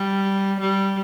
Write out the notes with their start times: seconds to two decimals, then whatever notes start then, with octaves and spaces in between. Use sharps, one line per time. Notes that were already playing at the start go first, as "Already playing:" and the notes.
Already playing: G3
0.60 G3